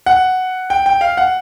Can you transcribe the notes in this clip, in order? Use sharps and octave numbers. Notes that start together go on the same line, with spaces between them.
F#5
G5
G5
F5
F#5